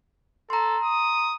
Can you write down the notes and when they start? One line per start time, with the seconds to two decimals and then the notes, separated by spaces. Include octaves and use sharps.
0.50 A4 A#5 C6
0.84 D#6